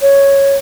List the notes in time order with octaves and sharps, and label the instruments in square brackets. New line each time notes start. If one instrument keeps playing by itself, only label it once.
[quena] C#5